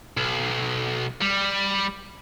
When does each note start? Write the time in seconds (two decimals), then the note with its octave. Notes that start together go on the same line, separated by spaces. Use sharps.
0.17 B1
1.21 G3